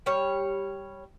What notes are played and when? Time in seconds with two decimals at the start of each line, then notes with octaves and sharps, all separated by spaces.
0.06 G3 C#5